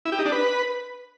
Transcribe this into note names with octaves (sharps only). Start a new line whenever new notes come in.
E4
G4
D#4
D4
B4